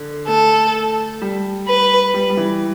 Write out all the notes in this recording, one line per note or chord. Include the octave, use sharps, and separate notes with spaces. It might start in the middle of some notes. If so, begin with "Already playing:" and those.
Already playing: D3
A3 A4
G3
B4
G3
G3
E3